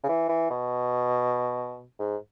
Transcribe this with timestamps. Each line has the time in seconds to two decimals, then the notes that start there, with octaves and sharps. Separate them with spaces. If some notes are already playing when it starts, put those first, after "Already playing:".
0.04 C#3
0.08 E3
0.29 E3
0.50 B2
1.99 G#2